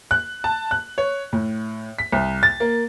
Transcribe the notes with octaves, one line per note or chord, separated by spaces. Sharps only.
F#6
A5
F#6
C#5
A2
B6
C2
A6
A#3